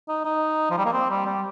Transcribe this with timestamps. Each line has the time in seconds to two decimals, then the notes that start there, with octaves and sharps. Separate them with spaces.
0.09 D#4
0.25 D#4
0.71 F3
0.78 G3
0.85 A#3
0.93 C4
1.10 G3
1.26 G3